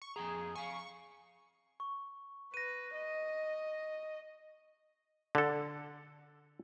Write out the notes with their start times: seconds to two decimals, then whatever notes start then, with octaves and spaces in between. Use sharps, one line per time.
0.02 C#6
0.16 F2 G#4 G5 A#5
0.55 F5 G#5 C#6
1.80 C#6
2.54 B4 A#6 D#7
2.94 D#5
5.35 D3 A4